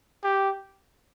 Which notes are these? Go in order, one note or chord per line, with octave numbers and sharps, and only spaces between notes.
G4